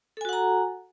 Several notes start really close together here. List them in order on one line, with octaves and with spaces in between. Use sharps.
A4 G#5 F#4 F#5 A#5